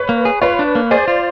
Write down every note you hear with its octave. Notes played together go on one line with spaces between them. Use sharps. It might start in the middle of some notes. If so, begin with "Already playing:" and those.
Already playing: B4 C#5
A#3
G#4
F4 B4 C#5
D4
A#3
G#4 C5 D5
F4